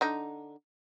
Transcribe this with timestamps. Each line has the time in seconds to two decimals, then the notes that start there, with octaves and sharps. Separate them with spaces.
0.01 D3 D#4